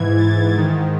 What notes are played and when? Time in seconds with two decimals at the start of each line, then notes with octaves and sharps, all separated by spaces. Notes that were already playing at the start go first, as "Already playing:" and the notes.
Already playing: G#2 E3 G#6
0.18 A6
0.53 G#2 D#3